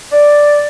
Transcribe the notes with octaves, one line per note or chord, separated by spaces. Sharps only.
D5